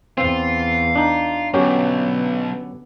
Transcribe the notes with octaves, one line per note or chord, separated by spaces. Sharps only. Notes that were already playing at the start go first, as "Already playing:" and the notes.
E2 C4 F4
D4 D#4
B1 F#2 D3 F#3 B3 C#4 G4